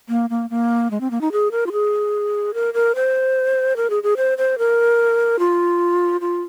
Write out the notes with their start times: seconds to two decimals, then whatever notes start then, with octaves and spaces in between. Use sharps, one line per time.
0.09 A#3
0.30 A#3
0.50 A#3
0.91 G#3
1.01 C4
1.11 A#3
1.21 D#4
1.32 G#4
1.51 A#4
1.67 F4
1.72 G#4
2.54 A#4
2.74 A#4
2.95 C5
3.76 A#4
3.90 G#4
4.03 G#4
4.17 C5
4.38 C5
4.58 A#4
5.39 F4
6.21 F4